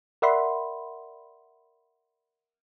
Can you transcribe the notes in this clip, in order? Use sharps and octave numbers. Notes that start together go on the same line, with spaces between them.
A#4 D5 E5 F#5 B5 C6